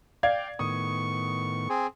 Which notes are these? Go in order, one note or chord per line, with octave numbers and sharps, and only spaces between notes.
D5 F5 G5 G#6
A2 D#3 B3 C#6 D#6
C4 G#4